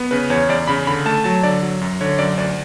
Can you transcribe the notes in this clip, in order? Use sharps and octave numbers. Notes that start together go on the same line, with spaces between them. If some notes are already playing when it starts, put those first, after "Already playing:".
Already playing: B3
C#3 B4
E2 C#5
E2 D5
C#3 B5
D3 B5
A3 A5
F#3 A5
D3 D5
F#3
F#2
D3 C#5
F#2 D5
D2 D5